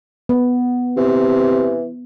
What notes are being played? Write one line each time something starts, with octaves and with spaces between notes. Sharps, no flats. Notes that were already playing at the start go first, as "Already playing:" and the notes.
B3
C3 E3